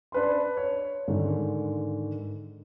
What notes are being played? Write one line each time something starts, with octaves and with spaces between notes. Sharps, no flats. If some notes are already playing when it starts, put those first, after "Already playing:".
D4 B4 C6
C#5
G#2 D3 D#3